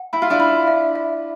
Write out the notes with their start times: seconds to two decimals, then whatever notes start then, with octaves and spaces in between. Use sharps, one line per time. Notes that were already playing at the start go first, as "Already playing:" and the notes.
Already playing: F#5
0.13 E4 B5
0.22 F4
0.30 D4 E4
0.40 B5
0.68 E5
0.96 E5